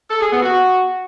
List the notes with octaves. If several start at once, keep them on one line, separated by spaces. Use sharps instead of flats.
A4
G#4
B3
F#4